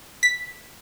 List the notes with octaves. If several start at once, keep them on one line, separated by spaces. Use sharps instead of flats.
B6